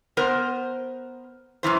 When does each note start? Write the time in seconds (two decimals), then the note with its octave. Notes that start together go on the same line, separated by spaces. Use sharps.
0.17 B3 A#4 C5
1.63 F#2 B2 E3 C5